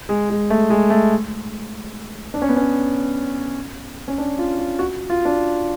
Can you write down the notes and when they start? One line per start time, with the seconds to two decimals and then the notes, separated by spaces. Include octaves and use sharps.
0.09 G#3
0.30 G#3
0.50 A3
0.70 G#3
0.90 A3
2.34 D4
2.42 C#4
2.49 B3
2.56 C#4
4.08 C#4
4.18 D4
4.39 F4
4.59 F4
4.79 F#4
5.10 F4
5.25 D4